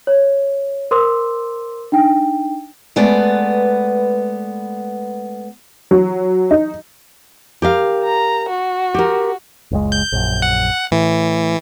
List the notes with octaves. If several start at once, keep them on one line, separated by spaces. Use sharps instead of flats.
C#5
A#4 C5 C6 D6 E6
D4 D#4 G5
G#3 A3 B3 B4 D5
F#3
D#4
G4 A#4 F5
A#5
F#4
G4 A#4
F#1 C#2 G#3
G6
A#1 F#2
F#5
A2 E3